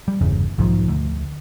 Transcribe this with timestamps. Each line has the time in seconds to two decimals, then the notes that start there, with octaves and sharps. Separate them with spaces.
0.08 G3
0.21 G1 E2 C#3
0.58 B1 G#2 D#3 F3
0.88 D2